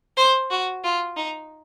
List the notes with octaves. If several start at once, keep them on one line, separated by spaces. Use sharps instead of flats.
C5
F#4
F4
D#4